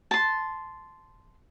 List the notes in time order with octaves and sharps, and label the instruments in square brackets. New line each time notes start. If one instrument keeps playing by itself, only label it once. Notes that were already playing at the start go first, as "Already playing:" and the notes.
[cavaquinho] A5 C6